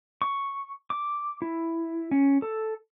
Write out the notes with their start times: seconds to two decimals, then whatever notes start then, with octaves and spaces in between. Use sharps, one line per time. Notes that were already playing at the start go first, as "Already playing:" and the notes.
0.22 C#6
0.90 D6
1.42 E4
2.11 C#4
2.42 A4